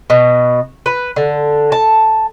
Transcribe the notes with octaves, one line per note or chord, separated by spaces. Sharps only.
B2
B4
D3
A5